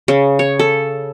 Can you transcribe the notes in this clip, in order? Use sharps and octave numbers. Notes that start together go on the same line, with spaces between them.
C#3
C#5
A4